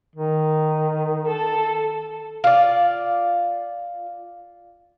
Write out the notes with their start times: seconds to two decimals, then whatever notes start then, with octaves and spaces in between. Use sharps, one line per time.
0.16 D#3
1.27 A4 A5
2.44 F4 D5